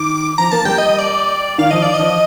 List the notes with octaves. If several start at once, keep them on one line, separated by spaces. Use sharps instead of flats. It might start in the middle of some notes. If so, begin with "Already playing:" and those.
Already playing: D#3 D6
F3 A#5
A#3 A5
G3 G5
D#5
D5
D#3 F5
F3 D#5
D5
D#5
F3